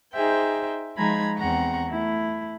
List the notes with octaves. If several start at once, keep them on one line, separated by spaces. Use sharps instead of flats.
D#4 G#4 C5 E5 G5
F3 G#3 D#4 A#5 B5 G#6
E2 C4 F#5 A#5 C#6
A3 E4